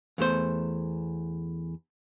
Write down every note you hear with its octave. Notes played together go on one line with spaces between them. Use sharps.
E2 A3 C5